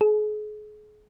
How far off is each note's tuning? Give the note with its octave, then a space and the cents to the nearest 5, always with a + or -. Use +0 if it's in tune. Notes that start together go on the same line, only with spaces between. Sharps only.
G#4 +35